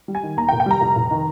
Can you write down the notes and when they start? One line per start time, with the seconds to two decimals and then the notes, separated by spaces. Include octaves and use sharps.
0.08 G3
0.15 G#5
0.23 D#3
0.37 D#2 A#5
0.49 G5
0.53 F1
0.60 G5
0.66 G3 A#5
0.81 F1
0.96 F1
1.11 D#3